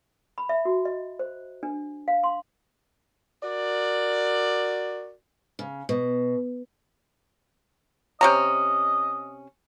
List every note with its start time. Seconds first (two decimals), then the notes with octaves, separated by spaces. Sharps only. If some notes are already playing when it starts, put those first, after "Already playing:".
0.38 B5
0.49 E5
0.65 F#4
0.85 D#5
1.19 C5
1.63 D4
2.08 F5
2.24 C6
3.42 F#4 A#4 D5
5.59 C#3
5.89 B2
8.21 C3 C#4 D#5 A#5